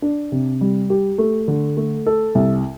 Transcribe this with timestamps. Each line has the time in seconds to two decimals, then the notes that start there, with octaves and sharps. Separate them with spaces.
0.02 D4
0.32 C3
0.61 G3
0.90 G4
1.18 A3
1.48 D3
1.77 A3
2.06 A4
2.35 C2